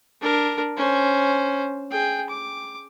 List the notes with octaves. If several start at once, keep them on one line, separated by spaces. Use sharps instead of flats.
D4 A#4
C#4 C5
G#4 G5
D6